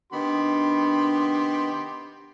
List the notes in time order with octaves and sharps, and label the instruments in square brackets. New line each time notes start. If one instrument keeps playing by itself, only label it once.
[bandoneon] D#3 B3 B5 [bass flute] D4 [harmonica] G4 C6